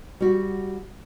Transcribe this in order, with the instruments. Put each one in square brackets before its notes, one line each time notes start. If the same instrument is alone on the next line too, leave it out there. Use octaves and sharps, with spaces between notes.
[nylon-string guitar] G3 F#4